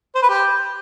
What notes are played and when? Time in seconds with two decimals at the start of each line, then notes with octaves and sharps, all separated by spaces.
0.15 C5
0.22 B4
0.29 G4